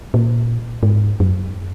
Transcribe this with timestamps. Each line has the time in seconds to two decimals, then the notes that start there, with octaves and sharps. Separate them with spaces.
0.14 A#2
0.83 G#2
1.20 F#2